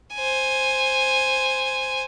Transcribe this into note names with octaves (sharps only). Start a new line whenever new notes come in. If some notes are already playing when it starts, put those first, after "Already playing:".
C5 G#5